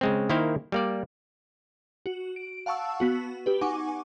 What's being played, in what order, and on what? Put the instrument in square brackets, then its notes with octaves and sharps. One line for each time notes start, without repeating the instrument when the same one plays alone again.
[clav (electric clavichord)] C#3 G#3 C4
D#3 A#3 E4 C5 F5 G5
G3 A#3 D5
[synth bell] F#4
D7
F5 F#5 A5 C#6 E6
B3 F#4
G4 B4
D#4 F#5 G#5 C#6 D6